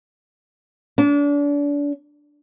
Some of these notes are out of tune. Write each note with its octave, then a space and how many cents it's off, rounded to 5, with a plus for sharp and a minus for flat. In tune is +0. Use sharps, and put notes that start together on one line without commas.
D4 -35